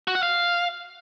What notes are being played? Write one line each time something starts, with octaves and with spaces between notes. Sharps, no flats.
F#4
F#5
F5